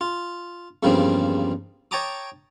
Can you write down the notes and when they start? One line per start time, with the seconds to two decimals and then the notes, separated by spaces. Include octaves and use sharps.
0.01 F4
0.83 E2 G2 C#3 F3 A#3 C4
1.91 C#5 G5 A5 A#5 D6 D#6